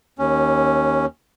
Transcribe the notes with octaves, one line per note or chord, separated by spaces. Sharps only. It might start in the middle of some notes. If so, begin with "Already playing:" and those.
D#2 C#4